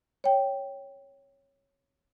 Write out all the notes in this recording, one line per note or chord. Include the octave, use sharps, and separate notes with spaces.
C#5 G5